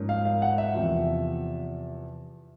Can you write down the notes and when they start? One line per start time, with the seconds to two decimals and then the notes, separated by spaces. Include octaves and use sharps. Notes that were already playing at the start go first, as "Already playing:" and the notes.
Already playing: G#2 F3 A#3 C#4
0.09 F5
0.25 F5
0.42 F#5
0.58 E5
0.74 E2 C3 F3